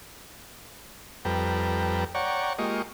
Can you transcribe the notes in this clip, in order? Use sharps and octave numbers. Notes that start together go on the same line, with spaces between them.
F2 G3 A4 B4 G5 A#5
C#5 D5 F#5 G5 A#5 C#6
G#3 A#3 F4 G4 D#5 C#6